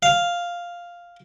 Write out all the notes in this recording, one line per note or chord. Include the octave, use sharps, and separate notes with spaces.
F5